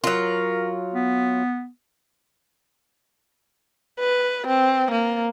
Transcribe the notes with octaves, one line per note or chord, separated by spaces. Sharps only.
F#3 F4 A#4
B3
B4
C4
A#3